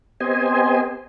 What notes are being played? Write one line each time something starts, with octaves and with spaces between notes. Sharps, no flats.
B3 C4 G4 C5 D#5 G#5